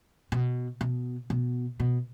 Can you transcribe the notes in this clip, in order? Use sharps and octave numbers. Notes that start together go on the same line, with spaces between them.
B2
B2
B2
B2